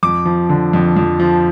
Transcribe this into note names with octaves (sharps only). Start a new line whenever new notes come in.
F2 D6
F3
D3
F2
F2
F3